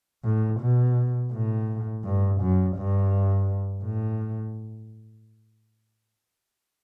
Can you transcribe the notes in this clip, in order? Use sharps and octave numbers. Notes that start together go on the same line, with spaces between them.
A2
B2
A2
G2
F#2
G2
A2